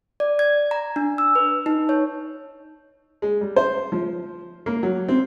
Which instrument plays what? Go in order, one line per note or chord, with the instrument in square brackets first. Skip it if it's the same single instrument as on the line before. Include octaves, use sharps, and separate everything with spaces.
[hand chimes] D5
G#6
A#5
D4
E6
B4
D#4
C#5
[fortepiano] G#3
G3
C5
F3
A#3
F#3
C4